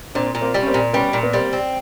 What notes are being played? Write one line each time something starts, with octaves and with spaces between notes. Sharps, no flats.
A#2 C4 D4
A#2
A#3 C4
G3
C#4
A#3 C4
A#2
G3 B3 C#4
A#2
B3
G3 A#3 C4
C4